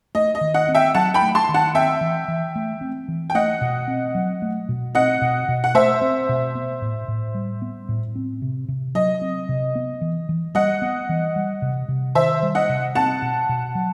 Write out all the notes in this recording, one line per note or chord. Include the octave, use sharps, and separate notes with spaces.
A3 D#5
D#5
D#3
D#5 F#5
C4
E5 G5
F#3 F#5 A5
G5 B5
A3
A5 C6
D#3
F#5 A5
C4 E5 G5
E3
E3
A3
C4
E3
G5
A3 D#5 F#5
B2
C4
F#3
A3
B2
C4 D#5 F#5
B2
B2
F#5
A3 C5 E5
C4
B2
B3
A2
A2
G3
B3
A2
C4
C3
C3
F#3 D#5
C4
C3
B3
E3
E3
G3 D#5 F#5
B3
E3
G3
C3
C3
D#3 C5 E5
G3
D#5 F#5
C3
C4 F#5 A5
B2
B2
F#3